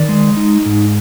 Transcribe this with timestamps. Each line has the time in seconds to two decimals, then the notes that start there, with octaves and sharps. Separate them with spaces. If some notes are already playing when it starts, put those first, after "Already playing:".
Already playing: D#3 D5
0.09 G#3
0.37 D#4
0.65 G#2